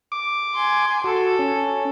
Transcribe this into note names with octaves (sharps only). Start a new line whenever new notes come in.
D6
G#5 C6
F#4 A4
C#4